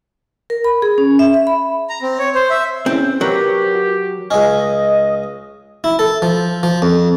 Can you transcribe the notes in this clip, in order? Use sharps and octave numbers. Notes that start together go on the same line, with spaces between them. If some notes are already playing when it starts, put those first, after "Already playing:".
A#4
B5
G#4
C#4
E5
E5
B5
A#5
C4
C#5
C5
E5
C4 C#4 E4 G#4
F#3 G4 A#4 B4 C#5
F#4
C#2 C#4 D#5
E4
A4
F3
F3
F2